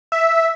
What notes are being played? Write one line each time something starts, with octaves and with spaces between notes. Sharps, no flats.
E5